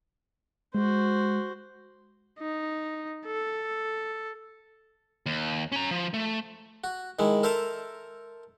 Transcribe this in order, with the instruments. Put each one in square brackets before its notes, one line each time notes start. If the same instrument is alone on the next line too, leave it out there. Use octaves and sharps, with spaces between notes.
[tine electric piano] G#3 [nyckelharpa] F#4 C5
[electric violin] D#4
A4
[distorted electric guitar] D#2
C#4 A#5
F3
A3
[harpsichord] F#4
D#3 G#3 E4
A4 A#4 C5 E5 A5 A#5